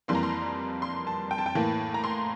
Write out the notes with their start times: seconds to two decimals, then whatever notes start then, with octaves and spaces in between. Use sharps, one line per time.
0.08 F2 E3 G3 A#3 C6
0.15 A#5
0.23 C6
0.82 C6
1.07 A5
1.31 G5
1.38 A5
1.46 G5
1.55 A2 E3 A#3 A5
1.94 A#5
2.04 C6